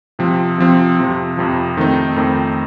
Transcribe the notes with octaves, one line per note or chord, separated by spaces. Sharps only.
C3 F3 C4
C3 F3 C4
F2 C3 F3
F2 C3 F3
F2 D#3 A3 C4 D#4
F2 D#3 A3 C4 D#4